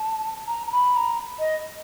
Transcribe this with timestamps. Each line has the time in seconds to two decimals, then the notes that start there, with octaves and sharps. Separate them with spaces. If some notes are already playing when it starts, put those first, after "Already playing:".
Already playing: A5
0.47 A#5
0.67 A#5
0.72 B5
0.96 A#5
1.39 D#5